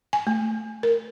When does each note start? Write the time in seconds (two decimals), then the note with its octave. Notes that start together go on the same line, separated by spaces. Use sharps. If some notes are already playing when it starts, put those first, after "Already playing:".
0.13 G#5
0.27 A3
0.83 A#4